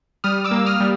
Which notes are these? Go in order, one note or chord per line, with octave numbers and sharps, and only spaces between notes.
G3 D#6 F6
D6 E6
A#3
D#6 F6
G3